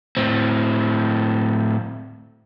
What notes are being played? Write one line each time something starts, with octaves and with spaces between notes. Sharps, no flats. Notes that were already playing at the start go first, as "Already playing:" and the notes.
A2 C4